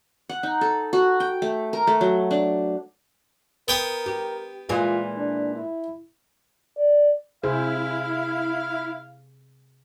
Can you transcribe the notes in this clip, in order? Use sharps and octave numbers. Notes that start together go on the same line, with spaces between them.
F#5
D#4
A4
F#4
G5
A3
A#4
A3
F#3
D4
B3 A#4 G5 D#6
G4
A#2 E3 G#3 F4
D4
E4
D5
C3 E4 G#4 C5 F5